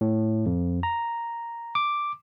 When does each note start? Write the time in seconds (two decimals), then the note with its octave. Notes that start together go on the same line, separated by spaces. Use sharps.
0.01 A2
0.46 F2
0.83 A#5
1.75 D6